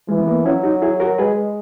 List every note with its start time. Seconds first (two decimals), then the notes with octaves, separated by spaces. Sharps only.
0.08 E3 G#3
0.20 B3
0.28 A#3
0.46 F#3 C#4 E4
0.63 D#4 F#4
0.82 E4 G#4
1.00 F#4 A#4
1.18 G#3 G#4 B4